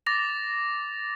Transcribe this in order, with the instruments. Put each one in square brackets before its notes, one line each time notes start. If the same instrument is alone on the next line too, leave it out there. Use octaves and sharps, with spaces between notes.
[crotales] D6 A6 A#6 F7